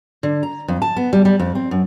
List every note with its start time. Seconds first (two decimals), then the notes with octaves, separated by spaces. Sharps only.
0.23 D3
0.43 A#5
0.68 F2
0.82 A5
0.97 B3
1.13 G3
1.25 G3
1.39 F2
1.55 C4
1.71 F#2